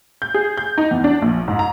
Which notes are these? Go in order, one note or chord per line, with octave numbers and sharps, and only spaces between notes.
G6
G#4
G6
D#4
E2
D4
A#1
G#2
A#5